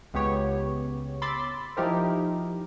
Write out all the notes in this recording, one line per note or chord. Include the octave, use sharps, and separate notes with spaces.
C#2 B3 G4 C#5
B5 C6 D6 E6 A6
F3 D#4 E4 G4 A#4 C5